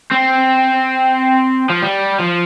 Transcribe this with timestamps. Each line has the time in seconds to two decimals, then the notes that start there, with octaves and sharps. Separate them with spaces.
0.11 C4
1.70 F3
1.82 G3
2.20 F3